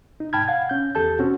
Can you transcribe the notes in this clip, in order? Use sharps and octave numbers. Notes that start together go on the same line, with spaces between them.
D#4
G#2 G5 A5 B5 F6 G#6
F5 F#5 G#6
C#4 G6
E2 G4 A4 A5 G6
C4 C#4 F#4